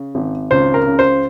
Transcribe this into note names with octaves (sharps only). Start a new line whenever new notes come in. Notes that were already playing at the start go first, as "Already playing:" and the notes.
Already playing: C#3
G#1
C#2 C5
A#4
C#3
C5